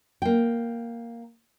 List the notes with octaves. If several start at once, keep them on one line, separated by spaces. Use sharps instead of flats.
A#3 G5